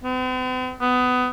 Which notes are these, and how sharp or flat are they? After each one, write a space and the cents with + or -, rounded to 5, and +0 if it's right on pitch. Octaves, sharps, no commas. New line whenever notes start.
C4 -45
B3 +20